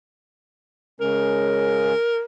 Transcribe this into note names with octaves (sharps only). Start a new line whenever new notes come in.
C#3 G#3 C#4 A#4